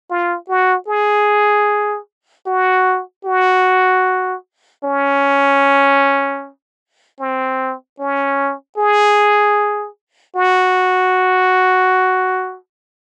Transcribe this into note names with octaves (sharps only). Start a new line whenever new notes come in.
F4
F#4
G#4
F#4
F#4
C#4
C4
C#4
G#4
F#4